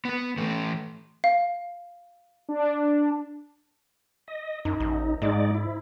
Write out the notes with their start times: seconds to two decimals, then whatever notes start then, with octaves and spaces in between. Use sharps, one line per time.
0.05 B3 B4
0.38 E3 A3
1.24 F5
2.49 D4
4.28 D#5
4.65 F#2 D#4
4.80 A1
5.22 G#2 G#3 D#4 D5
5.55 E4